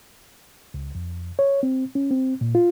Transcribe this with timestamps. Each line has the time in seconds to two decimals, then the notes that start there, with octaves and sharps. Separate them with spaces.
0.74 C#2
0.95 F2
1.39 C#5
1.63 C4
1.95 C#4
2.11 C4
2.41 A#2
2.55 F4